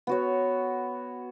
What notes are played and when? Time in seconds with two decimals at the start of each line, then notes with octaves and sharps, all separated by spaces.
0.07 B3 F#4 C#5